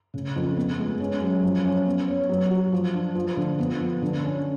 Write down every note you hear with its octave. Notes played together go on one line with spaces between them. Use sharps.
C#3
F2
B3
G#3
C#4
F#3
F3
C#4
B3
C#5
F#3
F#4
F3
D4
F3
D3
B3
F3
D3
C#4